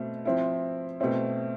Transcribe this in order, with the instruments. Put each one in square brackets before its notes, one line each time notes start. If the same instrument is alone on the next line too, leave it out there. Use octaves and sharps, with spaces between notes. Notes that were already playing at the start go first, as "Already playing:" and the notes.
Already playing: [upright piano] B2 A3 C4
F3 C4 E4
B2 A3 C4 E4